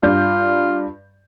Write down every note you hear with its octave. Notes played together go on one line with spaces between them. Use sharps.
G2 F4 D5 G6